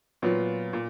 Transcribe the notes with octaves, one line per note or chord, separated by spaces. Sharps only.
A#2 F#3 B3 F4
A#2